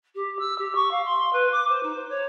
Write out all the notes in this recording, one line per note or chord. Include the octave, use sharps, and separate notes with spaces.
G4
E6
G4
C#6
F5
C6
B4
D6
C5
D#4
C5
C#5